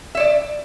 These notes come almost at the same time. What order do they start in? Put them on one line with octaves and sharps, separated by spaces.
E5 C#5 D5